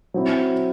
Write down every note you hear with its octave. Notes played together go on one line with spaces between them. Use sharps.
F#3 C4 E4